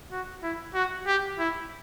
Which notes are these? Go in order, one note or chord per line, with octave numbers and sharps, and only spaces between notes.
F#4
E4
F#4
G4
E4